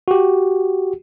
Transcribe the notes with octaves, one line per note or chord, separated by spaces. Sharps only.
F#4 G4